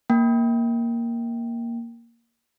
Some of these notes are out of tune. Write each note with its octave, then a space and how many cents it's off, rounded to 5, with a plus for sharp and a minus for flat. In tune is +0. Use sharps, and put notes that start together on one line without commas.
A#3 +0 G5 +0